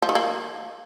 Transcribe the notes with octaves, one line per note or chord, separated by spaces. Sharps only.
F3
D#3
A#3